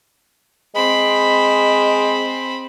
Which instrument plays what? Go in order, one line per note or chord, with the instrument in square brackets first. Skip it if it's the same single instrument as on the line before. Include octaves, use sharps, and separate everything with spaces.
[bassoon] G#3 [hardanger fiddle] C4 B5